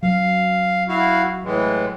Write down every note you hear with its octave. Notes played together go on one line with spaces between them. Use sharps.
F#3 F5
E4 F#4 F5
A2 E3 G#3